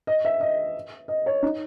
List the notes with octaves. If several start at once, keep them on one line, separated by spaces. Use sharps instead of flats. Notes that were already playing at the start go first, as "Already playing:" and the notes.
D#5
E5
D#5
D#5
C#5
D#4